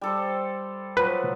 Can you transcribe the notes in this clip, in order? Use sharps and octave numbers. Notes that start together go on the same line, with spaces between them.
G3 A4 C5
F3 F#3 B4